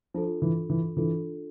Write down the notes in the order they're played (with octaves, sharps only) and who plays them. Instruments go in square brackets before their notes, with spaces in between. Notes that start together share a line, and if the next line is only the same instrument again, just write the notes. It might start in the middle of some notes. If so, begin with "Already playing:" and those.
[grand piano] F3 [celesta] D4 F4 A4
[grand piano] E3
E3
[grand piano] E3 [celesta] D4 F4 A4